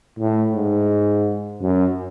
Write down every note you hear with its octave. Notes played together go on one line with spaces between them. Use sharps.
A2
G#2
F#2